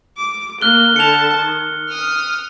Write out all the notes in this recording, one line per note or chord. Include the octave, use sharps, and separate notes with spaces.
D6
A#3 F6 F#6 G7
D3 A5 C#7 F7
D#3
D#6 F6